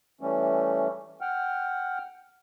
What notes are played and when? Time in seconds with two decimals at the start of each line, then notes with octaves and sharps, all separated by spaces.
0.21 E3 G3 A3 C#4
1.21 F#5 G5 F6